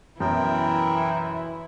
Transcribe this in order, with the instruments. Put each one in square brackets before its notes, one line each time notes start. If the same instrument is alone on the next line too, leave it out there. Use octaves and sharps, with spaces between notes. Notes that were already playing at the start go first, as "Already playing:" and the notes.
[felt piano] F#2 B2 [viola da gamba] E3 E4 [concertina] A#4 G5